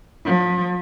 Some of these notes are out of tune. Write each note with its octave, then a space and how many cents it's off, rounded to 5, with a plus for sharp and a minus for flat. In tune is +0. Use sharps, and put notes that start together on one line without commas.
F3 +40